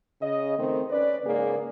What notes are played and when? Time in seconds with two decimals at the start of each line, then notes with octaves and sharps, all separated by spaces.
0.21 C#3 D#5
0.59 D#3 A3 C4
0.90 C#4 B4 D5
1.25 G#2 C#3 A#3 G#4 D5